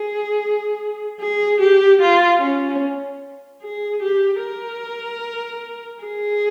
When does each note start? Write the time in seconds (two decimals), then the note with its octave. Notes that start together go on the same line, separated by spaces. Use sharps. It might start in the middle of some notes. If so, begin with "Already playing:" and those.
Already playing: G#4
1.21 G#4
1.61 G4
2.01 F4
2.42 C#4
3.62 G#4
4.02 G4
4.43 A#4
6.04 G#4